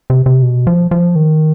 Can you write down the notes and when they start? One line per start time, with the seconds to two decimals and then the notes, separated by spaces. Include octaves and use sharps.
0.10 C3
0.26 C3
0.43 B2
0.67 F3
0.91 F3
1.15 D#3